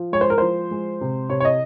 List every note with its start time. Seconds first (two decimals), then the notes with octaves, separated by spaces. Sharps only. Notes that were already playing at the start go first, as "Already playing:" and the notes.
Already playing: F3
0.12 G#3 C#5
0.21 C5
0.30 A#4
0.38 F3 C5
0.71 G#3
1.01 C3
1.29 C3 C#5
1.40 C#5
1.45 D#5